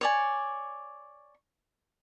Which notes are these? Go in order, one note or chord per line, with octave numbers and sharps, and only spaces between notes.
C#5 D5 G#5